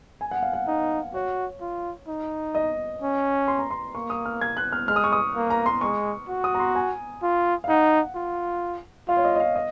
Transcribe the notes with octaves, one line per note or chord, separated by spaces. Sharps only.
G#5
F#5
F5
F#5
D#4 F5
F#4 C#5
F4
D#4
D#5
C#4
C6
A#5
C6
A#3 C#6
D#6
F6
G#6
F#6
F6
G#3 F6
D#6
C#6
D#6
A#3
A#5
C6
G#3 C#6
F#4
D#6
A#5
C6
G#5
F4
F5
D#4 F#5
F4
F4 F5
C#5
D#5
D#5
F5
D#5